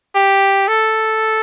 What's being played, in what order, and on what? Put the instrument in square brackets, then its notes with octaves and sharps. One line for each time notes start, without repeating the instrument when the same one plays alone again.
[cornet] G4
A4